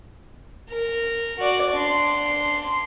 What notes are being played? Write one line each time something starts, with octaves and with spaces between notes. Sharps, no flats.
A#4
F#4 D5
D4 C6